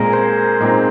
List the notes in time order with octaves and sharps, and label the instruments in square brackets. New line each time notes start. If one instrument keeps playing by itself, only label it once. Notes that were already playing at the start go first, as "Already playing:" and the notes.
Already playing: [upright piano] A#2 G#3 C4 [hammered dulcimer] A#4
[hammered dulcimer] C5
[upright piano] A#2 G#3 C4 [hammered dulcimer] D#4